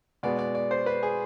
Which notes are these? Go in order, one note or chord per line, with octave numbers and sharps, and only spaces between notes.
B2 G#3 B3 D5
D5
D5
C5
B4
G#4